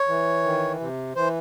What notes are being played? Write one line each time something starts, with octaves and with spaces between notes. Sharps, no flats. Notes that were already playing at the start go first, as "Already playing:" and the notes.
Already playing: C#5
E3
D#3
C3
E3 C5